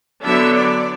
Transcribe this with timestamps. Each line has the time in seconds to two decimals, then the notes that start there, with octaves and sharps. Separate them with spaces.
0.24 D3 F#3 B3 D4 E5
0.53 D5